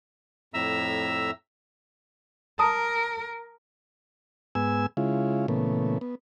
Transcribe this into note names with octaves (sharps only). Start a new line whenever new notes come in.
F2 A2 E5 A#5 E6
A#4 A5 A#5 D#6
G#2 B3 G#5 E6
C#3 G#3 E4 F4
A#2 C#3 E3 A3 B3
B3